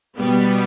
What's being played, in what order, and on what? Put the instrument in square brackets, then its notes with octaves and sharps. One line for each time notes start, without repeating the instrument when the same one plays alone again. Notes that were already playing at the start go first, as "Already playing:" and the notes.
[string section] B2 G3 B3